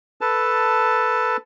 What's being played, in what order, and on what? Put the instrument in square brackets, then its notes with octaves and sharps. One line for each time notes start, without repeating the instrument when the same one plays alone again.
[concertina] A4 B4 A5